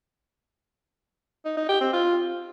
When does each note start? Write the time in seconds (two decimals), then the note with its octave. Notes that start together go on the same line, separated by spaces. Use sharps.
1.45 D#4
1.57 D#4
1.69 G4
1.81 C4
1.93 F4